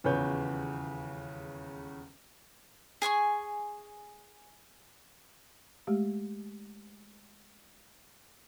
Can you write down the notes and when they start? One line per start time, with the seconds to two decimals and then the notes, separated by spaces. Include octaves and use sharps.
0.04 D#1 E2 C#3 B4 C#5 G6
3.02 G#4 G#5 C6 C#6
5.87 G#3 A3 G4